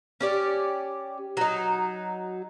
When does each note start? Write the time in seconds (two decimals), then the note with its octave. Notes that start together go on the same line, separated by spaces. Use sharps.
0.21 C#4 G4 D5
1.37 F#3 D#4